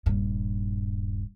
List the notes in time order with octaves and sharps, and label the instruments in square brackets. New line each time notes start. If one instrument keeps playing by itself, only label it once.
[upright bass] D#1 G2